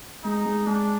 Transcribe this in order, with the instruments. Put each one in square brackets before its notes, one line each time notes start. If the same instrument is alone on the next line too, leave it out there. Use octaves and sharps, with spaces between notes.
[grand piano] G#3 [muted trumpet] D#4
[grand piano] G#3
[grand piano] G#3 [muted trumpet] D4